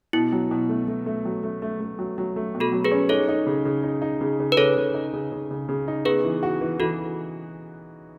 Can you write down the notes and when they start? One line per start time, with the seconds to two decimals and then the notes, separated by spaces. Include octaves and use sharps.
0.13 B2 E4
0.32 F#3
0.51 B2
0.69 A3
0.88 A3
1.06 A3
1.25 F#3
1.43 A3
1.62 A3
1.80 A3
1.99 F#3
2.18 F#3
2.36 A3
2.55 B2
2.60 F#4 A4
2.73 F#3
2.85 G#4 B4
2.91 C#4
3.09 D#4 A4 C#5
3.28 D#4
3.46 C#3
3.65 C#3
3.84 D#4
4.02 D#4
4.21 C#3
4.40 C#3
4.52 B4
4.57 C#3 A4 C#5
4.77 C#3
4.94 D#4
5.13 C#3
5.32 C#3
5.51 C#3
5.69 C#3
5.88 D#4
6.05 B3 G#4 B4
6.24 E3
6.43 F#4
6.61 E3
6.80 E3 F#4 A4